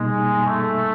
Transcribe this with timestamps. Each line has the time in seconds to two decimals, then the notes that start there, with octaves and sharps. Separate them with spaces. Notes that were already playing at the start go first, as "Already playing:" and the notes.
Already playing: B2 G3 G#3 A#3 D#4
0.45 A3